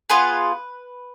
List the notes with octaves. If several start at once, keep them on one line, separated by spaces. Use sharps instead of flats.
B3 F4 G#4 B4